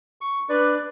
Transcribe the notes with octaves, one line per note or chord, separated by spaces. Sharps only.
C#6
D4 B4 D5